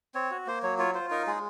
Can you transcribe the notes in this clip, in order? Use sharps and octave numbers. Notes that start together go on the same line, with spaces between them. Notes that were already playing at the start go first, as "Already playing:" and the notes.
C4 C#5
F#4
A#3 C5
F#3 C#5
F4 C#5
F4 C5
D#4 A#4
G#3 G#4